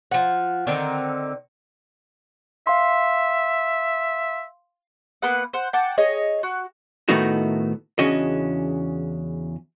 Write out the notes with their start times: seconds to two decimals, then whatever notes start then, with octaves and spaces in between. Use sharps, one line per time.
0.11 F3 F#5
0.67 D3 D#3 C4 D#4
2.67 E5 F5 C6
5.22 A#3 B3 B4 F#5
5.53 C5 F#5
5.73 F#5 G5 A5 D6
5.98 G#4 C#5 D#5
6.43 F#4
7.09 A2 D#3 A3 B3 D#4 F#4
7.99 E2 C#3 C#4 D4 F#4 D#5